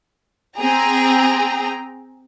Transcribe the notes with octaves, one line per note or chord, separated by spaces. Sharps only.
C4 G#4 G5 A#5